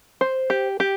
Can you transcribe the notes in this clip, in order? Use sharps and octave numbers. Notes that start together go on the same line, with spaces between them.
C5
G4
G4